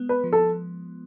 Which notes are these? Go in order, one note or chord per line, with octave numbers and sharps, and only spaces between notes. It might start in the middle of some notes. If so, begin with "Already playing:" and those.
Already playing: G#3 B3
B4
F3
A4